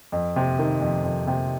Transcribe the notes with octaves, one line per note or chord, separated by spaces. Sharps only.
F2
C3
D#3
F2
F2
C3